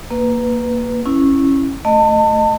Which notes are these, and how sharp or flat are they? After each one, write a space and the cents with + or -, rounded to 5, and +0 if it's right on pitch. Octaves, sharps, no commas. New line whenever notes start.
A#3 +0 B4 +0
C#4 -15 E4 +0
A3 +0 D#5 -10 A5 +30